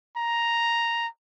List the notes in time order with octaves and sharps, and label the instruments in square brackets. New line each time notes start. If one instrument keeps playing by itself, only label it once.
[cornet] A#5